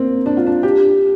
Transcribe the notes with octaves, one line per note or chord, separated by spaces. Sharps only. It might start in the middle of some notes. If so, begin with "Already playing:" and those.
Already playing: A#3 C4
D4
F4
D4
G4